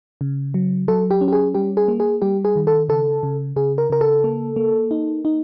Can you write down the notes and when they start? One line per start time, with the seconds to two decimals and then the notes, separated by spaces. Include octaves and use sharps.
0.21 C#3
0.54 F#3
0.88 F#3 A4
1.11 G4
1.21 C#4
1.28 G4
1.32 G#4
1.55 G3 G4
1.77 G#4
1.88 A#3
2.00 G#4
2.22 G3 G4
2.45 G#4
2.56 D#3
2.67 A4
2.89 C#3 A4
3.23 C#3
3.56 C#3 G#4
3.78 A#4
3.90 C#3 A#4
4.01 A4
4.24 A#3
4.56 A#3
4.91 D#4
5.25 D#4